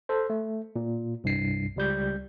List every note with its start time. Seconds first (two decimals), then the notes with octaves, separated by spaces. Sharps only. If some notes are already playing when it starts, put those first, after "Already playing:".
0.09 A4 C5
0.30 A3
0.76 A#2
1.24 C2 G2 C7
1.76 C#2 G3 G6